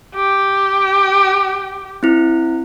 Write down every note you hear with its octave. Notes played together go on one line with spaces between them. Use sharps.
G4
C4 E4